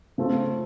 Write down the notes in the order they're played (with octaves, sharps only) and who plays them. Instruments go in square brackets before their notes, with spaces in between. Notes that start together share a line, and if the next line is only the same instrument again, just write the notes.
[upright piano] C#3 A3 C4 F4